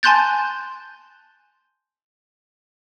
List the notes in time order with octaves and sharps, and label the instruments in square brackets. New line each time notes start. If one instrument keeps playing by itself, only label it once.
[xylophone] G#5 A5 C6 F#6 G6 A6